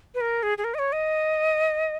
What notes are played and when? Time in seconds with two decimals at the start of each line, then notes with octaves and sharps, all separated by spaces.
0.15 B4
0.21 A#4
0.43 G#4
0.58 G#4
0.64 A#4
0.74 D#5
0.79 C#5
0.92 D#5